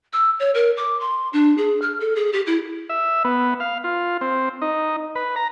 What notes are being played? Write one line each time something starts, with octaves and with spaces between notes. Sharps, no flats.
E6
C#5
A#4
D6
C6
D4
G#4
F6
A4
G#4
G4
E4
E5
B3
F5
F4
C4
D#4
B4
A#5